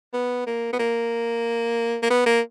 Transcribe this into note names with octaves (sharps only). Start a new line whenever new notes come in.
B3
A#3
B3
A#3
A#3
B3
A#3